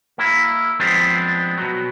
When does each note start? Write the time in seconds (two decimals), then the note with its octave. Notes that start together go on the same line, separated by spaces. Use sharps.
0.18 A#3 E4
0.80 F3 G#3 B3 C4 D4
1.58 B2 F#3